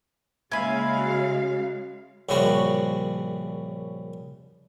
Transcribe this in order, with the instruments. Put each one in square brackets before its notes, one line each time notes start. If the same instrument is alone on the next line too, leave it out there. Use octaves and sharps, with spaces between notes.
[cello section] C#3 G#3 F5 [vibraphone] A#3 [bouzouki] E4 [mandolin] G#5 B5
[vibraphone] F#4
[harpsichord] A#1 F#2 C#3 F3 G3 F#4